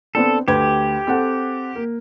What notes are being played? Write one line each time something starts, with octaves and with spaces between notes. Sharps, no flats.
B3 C4 D4 A4
D2 G4 B4 G#6
C4 A4 F#5
A#3